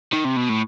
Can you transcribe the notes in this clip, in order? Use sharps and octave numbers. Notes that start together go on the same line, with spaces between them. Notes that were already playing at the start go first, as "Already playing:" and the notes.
D#3
C3
B2
A2